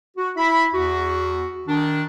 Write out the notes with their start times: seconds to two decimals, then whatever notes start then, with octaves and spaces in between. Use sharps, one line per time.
0.17 F#4
0.36 E4 B5
0.73 E2 F#4
1.68 D#3 D4